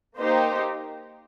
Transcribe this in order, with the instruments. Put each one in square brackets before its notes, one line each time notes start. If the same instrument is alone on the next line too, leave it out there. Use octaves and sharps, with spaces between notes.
[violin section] A#3 D#4 G4 C5